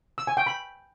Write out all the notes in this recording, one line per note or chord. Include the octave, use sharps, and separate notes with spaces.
E6
G#5
G5
B5